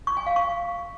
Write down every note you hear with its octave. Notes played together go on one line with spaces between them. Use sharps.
C#6
G#5
F5
C#6